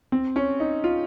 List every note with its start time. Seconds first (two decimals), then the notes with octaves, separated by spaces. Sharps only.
0.12 C4
0.36 C#4
0.60 D#4
0.84 F4